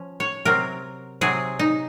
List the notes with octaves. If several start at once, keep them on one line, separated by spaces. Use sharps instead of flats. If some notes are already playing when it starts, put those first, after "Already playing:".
Already playing: F3 C#4
C#5
C3 F#3 C4 A#4
C3 F#3 C4 G#4
D#4